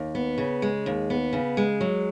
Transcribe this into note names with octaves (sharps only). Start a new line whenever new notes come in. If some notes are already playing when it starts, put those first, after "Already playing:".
Already playing: D#2
B3
C#3
G#3
D#2
B3
C#3
G#3
F#3